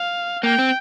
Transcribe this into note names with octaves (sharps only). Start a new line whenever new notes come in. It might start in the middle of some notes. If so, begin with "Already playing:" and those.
Already playing: F5
A#3 G5
C4